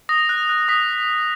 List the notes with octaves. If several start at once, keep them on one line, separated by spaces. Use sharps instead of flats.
D#6 A#6
F#6
F#6
D#6 B6